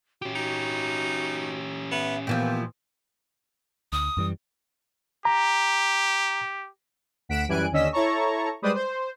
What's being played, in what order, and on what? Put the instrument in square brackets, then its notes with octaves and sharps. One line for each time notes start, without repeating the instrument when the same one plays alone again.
[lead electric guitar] C#4 G4 [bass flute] F#4
[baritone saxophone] D#4 [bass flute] F#4
[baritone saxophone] B3 [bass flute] E5
[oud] A#2 E3 F3 [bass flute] B3 [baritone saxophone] G4
[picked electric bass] D2 [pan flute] D#6
[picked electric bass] F#2 E3 G3
[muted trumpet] G4 [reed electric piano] A#5
[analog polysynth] D2 F#5 B6 D7 E7
F#2 E3 G3 G#5 F#6 D7
D#2 D3 C#4 D#5 E6 B6
E4 A4 C#5 A5 A#5 C#6
G3 G#3 B4 C5 D5 D#6
C5